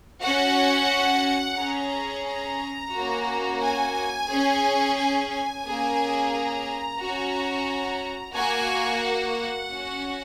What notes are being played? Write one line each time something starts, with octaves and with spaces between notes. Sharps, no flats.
C#4 F#4 F#5
C#4 G#4 A#5
A#5
A#3 C#4 F#4
G#5
C#4 G#4
G#5
G#5
A#3 C#4 G#4
A#5
C#4 F#4
A#3 F#4 G#5
F#5
C#4 F#4